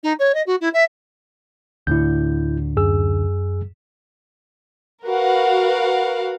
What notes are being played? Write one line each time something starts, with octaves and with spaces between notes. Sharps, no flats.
D#4
C#5
D#5
F#4
E4
E5
D2 A2 D3 E4 G6
F#2 G#4 E6
F#4 A#4 B4 F5 F#5